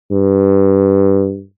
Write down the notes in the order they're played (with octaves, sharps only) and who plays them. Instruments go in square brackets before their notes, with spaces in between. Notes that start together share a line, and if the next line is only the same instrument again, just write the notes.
[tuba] G2